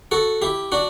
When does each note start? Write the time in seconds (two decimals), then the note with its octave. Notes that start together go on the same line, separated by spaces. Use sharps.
0.11 F#4 A4
0.42 E4 G4
0.72 D4 F#4